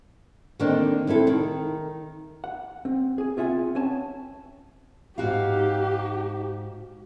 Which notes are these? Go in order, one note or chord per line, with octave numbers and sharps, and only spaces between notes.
D3 D#3 A#3 C4 D4 D#4
G#3 C4 E4 A4
D#3
F#5
C4
G#4 G#5
C4 F4 E5 F#5 G#5
C4 C#4 G#5 A5
G#2 D#4 F#4 G4 F5